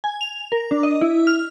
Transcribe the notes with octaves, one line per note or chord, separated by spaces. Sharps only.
G#5
F7
A#4
D4
D#5
E4
F6